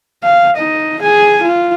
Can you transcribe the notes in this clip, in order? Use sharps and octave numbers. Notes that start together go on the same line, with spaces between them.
F5
D#4 D#5
G#4 G#5
F4